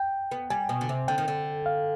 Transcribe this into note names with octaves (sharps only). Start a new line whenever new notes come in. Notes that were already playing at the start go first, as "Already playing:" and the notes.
Already playing: G5
B3
G3 G#5
B2
D3
C3
D3 G5
D#3
D3
F5